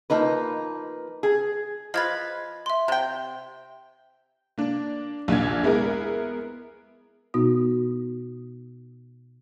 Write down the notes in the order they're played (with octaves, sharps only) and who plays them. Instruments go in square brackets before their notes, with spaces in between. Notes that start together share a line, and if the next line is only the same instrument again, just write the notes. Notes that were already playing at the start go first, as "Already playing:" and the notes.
[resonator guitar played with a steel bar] F3 A#3 D#4 B4
G#4
[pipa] F3 F4 B4 [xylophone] D#5 G#6 A6
[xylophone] E5 C6
[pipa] C3 G5
[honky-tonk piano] A#3 D4
A#1 D#2 D4 G#6
G#3 B3 E4 G#4 A#4
[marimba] B2 B3 D#4 F#4 D#6